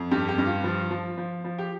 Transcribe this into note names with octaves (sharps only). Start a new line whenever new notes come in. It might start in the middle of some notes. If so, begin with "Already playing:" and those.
Already playing: F2
G2 G4
G4
G2
F4
F3
F3
F3
F3
G4